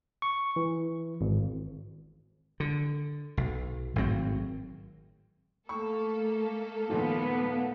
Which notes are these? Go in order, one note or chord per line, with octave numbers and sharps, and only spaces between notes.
C#6
E3
G#1
D3
B1
G#1 A2 F#3 C4
A3 A#3 A4 C#6
D#2 A#2 F3 B3